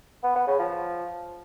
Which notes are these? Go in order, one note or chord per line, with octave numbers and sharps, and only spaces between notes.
B3
B3
C#3
F3